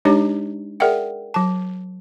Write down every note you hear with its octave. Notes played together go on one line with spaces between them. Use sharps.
G#3 D4 D#4 G4 C#5
G#4 A#4 D5 E5 F#5 G5
F#3 A5